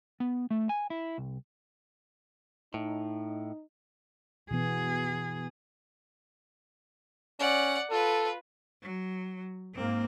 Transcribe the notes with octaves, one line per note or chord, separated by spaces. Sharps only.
B3
A3
G#5
E4
C2
A2 D#4
B2 E3 B3 G#4
C#4 D5 F#5
F4 A4 B4
F#3
G#2 A#3 C4